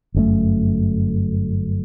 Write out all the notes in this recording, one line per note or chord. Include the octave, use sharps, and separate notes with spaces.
G1 F#2 D3 A3